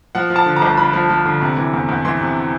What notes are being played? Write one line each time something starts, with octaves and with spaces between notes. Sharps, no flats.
F3 F#5
F3
A5
D3
A#5
G1
D3 B5
F3
F3
D3
C3
E3
E2
E2
E3 C6
C3